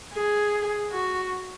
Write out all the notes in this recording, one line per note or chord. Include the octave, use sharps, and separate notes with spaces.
G#4
F#4